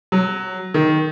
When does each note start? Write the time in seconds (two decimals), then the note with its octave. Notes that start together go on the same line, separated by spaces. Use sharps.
0.12 F#3
0.74 D#3